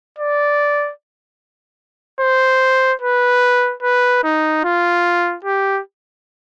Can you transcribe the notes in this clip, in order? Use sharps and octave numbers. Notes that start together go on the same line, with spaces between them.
D5
C5
B4
B4
D#4
F4
G4